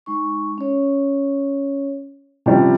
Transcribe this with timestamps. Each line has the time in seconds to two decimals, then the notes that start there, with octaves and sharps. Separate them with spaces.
0.06 G#3 D#4 C#6
0.58 C#4 C#5
2.46 C3 F3 G3 C#4